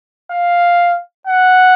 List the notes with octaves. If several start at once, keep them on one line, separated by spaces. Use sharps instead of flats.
F5
F#5